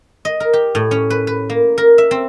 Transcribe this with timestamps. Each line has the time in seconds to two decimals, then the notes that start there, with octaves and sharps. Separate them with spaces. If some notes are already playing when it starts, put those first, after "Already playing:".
0.25 D#5
0.40 A#4
0.53 G4
0.75 A2
0.91 C#4
1.10 B4
1.27 B4
1.50 A#3
1.78 A#4
1.98 E5
2.11 C4